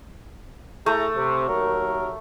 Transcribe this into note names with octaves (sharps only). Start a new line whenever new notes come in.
A3 E4 G#4 A#5
C3
D#2 F#3 A#4